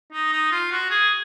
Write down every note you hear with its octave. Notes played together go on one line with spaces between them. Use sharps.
D#4
D#4
F4
F#4
G#4